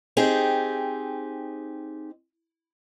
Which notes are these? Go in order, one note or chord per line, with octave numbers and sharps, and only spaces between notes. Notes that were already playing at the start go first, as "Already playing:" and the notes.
C4 D#4 G4 G#4